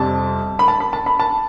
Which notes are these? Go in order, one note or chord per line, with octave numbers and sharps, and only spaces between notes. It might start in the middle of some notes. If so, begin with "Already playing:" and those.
Already playing: F2 C3 G3 A5
B5
A5
B5
A5
B5
A5